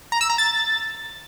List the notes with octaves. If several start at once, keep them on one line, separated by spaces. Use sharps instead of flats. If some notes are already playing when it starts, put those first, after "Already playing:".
A#5
E6
A#5
A6